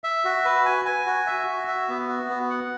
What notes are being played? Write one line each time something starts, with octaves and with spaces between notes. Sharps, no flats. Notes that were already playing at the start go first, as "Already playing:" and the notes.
E5
F#4
B4
G#5
G#5
F#4
E5
F#4
E5
B3
F#4
B3
F#5